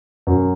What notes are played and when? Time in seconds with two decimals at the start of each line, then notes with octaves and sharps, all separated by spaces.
0.27 F#2